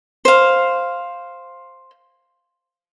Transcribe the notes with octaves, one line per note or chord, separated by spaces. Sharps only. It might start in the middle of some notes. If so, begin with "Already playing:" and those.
C5 F5